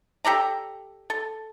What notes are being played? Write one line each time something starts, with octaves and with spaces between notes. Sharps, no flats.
G4 A4 D5 A#5
A4